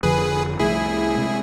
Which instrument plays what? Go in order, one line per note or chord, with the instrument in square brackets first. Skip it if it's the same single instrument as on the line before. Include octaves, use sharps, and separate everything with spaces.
[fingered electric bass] F1 F2 D3 F3 [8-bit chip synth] G#4 B4
[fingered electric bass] C2 C3 F3 A3 [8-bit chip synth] E4 G#4
[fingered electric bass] C3 G#3